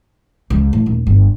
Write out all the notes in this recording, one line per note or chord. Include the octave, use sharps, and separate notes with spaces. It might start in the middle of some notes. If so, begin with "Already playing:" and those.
C#2
A2
D#1
G1